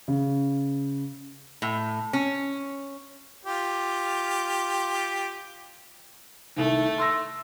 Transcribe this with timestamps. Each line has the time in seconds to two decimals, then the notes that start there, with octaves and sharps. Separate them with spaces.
0.08 C#3
1.62 A2
2.13 C#4
3.45 F4 G4
6.56 C2 D#3 A3
6.98 C6 E6 A#6